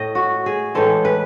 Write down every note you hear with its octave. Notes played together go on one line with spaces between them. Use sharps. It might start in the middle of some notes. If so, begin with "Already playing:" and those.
Already playing: A2 D#5
F#4
G#4
A2 E3 G#3 A4
B4